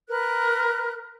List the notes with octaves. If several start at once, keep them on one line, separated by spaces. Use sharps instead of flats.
A#4 B4 F#6